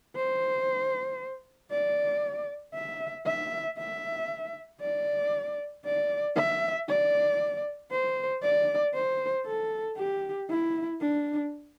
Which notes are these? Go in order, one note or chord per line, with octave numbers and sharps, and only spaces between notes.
C5
D5
E5
E5
E5
D5
D5
E5
D5
C5
D5
C5
A4
G4
E4
D4